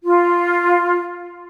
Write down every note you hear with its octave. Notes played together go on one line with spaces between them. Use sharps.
F4